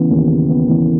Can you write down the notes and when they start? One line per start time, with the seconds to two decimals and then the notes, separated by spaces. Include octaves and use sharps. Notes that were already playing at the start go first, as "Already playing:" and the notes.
Already playing: C#3 E3 B3
0.10 D#2
0.30 C#3
0.49 B3
0.69 E3